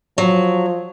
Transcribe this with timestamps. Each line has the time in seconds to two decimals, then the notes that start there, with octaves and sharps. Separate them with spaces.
0.18 F3 F#3